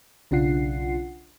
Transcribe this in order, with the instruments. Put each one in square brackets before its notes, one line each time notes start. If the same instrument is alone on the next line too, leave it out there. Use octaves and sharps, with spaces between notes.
[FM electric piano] B1 C#3 D4 F4 F#5 C7